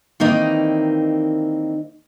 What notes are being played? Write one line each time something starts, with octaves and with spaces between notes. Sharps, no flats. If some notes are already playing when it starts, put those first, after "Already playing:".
D#3 E3 A#3 C4 D#4 D5